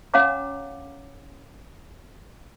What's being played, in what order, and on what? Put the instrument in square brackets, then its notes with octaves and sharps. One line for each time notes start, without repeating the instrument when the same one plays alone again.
[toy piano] C#4 C#5 F5 F#5 A#5 D6